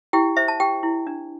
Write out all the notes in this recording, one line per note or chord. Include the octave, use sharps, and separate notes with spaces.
E4 G4 G5
C5 E5
A5
G4 G5
E4
D4